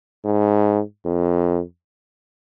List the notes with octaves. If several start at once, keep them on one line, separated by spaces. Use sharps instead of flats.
G#2
F2